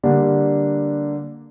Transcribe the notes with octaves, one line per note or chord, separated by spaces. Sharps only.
D3 G3 A#3 D4